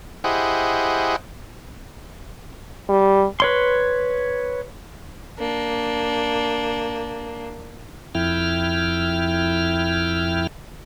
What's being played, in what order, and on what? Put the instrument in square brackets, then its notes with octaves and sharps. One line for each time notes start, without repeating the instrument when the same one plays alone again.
[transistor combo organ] E4 G4 G#4 C5 D#5 F#5
[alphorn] G3
[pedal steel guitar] B4 C#5 C6
[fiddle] A#3 [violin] D4
[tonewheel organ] F2 E4 G5 F6